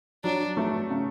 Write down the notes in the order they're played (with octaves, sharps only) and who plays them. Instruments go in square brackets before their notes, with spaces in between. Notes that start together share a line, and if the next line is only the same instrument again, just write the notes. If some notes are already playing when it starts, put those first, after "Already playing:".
[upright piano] F#3 [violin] D4
[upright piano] A3
C#3